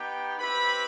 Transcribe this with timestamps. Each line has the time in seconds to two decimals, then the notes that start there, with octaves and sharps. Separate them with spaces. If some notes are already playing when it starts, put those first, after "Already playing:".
Already playing: B3 D#4 G4 G5
0.39 C4 E4 G4 B4 B5